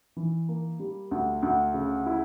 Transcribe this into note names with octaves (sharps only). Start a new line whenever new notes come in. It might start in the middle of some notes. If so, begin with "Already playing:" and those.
E3
A#3
G3
D2
D2
C#3
E4